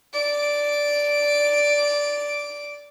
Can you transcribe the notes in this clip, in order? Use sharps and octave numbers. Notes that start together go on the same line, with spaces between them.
D5 D7